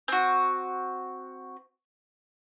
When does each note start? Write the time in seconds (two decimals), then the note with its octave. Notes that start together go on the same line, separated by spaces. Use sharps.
0.08 C4 F#4